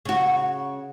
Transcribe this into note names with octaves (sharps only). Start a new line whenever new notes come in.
C#3 F#4